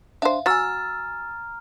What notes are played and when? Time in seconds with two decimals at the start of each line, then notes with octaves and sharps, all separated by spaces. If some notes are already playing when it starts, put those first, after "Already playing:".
0.22 D4 C5 E5 F5
0.46 F#3 F#4 G#5 A#5 E6 F6 A6